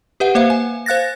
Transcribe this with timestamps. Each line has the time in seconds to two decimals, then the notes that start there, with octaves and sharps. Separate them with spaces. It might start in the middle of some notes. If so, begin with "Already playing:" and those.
0.20 G4 B4 E5 F#5
0.35 A#3 C5 E5 F5
0.50 G#5
0.86 C5 F5 F#6 A6 A#6